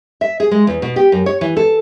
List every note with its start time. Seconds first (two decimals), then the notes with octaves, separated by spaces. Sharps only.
0.21 E5
0.40 G#4
0.51 G#3
0.67 E2
0.82 B2
0.96 G4
1.12 F#2
1.26 C#5
1.41 E3
1.57 A4